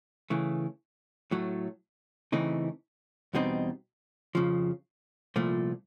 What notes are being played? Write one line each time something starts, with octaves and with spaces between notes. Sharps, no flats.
C#3 E3 A3
A2 F#3 A3
C#3 E3 A3 C4 D#4
E2 B2 G3 C4 D#4
F2 C#3 F3
C2 A#2 F3 A3